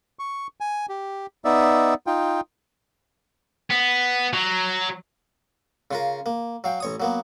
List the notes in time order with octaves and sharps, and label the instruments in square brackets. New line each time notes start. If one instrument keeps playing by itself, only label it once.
[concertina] C#6
G#5
G4
B3 D#4 D5 E5
D#4 F4 G5
[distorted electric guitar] B3
F#3
[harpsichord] C#3 F4 A#4
A#3
F#3 F5 G5
A1 C#5 D#6
F#3 A#3 B3